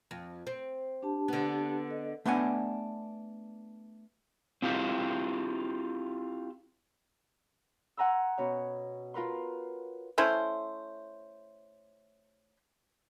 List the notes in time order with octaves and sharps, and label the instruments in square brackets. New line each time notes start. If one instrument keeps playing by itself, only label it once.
[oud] F2
C4
[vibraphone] D4 G4 A5
[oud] D3 B3
[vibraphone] A4 D#5
[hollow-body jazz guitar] A3 B3 D4 F#5 G#5
[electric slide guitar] C4 E4 F4 G4
[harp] F#5 G#5 A#5 C6 E6
B2 C#4 C#5
F4 A#4 B4 C6
[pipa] A3 C#4 E4 C5